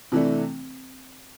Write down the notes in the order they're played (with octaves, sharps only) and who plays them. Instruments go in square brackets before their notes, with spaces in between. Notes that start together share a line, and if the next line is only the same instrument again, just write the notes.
[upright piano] C3 E3 A3 D4 [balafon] C4